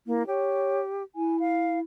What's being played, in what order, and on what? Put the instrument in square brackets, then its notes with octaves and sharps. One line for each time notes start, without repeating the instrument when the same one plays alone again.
[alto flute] A#3 [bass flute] E4
[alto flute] G4 [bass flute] C#5
[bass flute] E4 [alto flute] G#5
[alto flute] F5